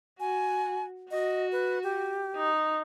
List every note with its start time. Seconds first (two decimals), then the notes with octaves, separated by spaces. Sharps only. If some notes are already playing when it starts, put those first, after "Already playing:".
0.20 F#4 G#5
1.11 F#4 D#5
1.52 B4
1.83 G4
2.36 D#4